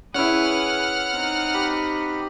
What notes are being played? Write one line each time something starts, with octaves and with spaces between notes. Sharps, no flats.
C#4 E4 G#4 B4 F#5 F6
C4 D#4
G4 B5